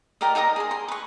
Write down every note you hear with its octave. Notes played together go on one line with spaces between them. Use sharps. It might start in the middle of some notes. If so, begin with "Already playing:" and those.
G4 A#4 D5 D#5
D#4 A#4 D#5 D#6
G#4 C6
C6
B4 C#6